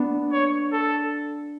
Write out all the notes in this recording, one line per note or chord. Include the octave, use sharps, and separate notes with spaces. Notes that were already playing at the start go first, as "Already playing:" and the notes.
Already playing: B3 D4
C#5
A4